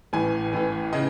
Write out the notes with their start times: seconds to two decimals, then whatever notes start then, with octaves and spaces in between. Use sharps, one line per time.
0.13 A1 A2 E3 G#5
0.53 A1 A2 E3
0.93 C#3 E3 D#5